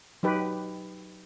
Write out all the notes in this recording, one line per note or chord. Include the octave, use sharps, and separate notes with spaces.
F#3 D#4 G4 B4